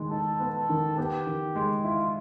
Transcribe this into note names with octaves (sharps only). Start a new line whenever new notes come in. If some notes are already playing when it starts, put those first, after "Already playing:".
Already playing: D#3 G#3
D#4 A4
B3
A4
D#3
B3 G4
D#3
G#3
E4 F4